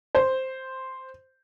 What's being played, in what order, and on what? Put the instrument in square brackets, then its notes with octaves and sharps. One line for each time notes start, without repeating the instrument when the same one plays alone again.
[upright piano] C5